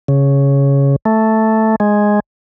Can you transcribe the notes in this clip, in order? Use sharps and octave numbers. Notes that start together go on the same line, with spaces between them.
C#3
A3
G#3